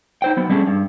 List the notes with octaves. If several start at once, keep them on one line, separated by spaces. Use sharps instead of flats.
D#4 C5 G5
F#3 B3
G3 A3 C#4 D4 G#4
G2